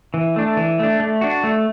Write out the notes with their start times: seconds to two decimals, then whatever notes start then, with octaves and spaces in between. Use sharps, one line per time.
0.14 E3
0.36 A3 D4
0.57 E3
0.79 A3 D4
1.00 A3
1.21 D4 F#4
1.44 A3